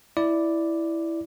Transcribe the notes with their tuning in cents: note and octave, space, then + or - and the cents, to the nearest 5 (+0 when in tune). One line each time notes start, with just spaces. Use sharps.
E4 +0 D5 +0